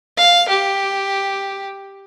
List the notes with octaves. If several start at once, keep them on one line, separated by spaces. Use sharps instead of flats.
F5
G4